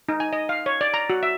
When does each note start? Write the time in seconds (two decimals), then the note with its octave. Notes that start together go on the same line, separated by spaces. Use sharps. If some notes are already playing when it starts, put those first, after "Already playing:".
0.09 D#4
0.20 G#5
0.33 D#5
0.49 F5
0.66 C#5
0.81 D5
0.94 A#5
1.10 F#4
1.23 E5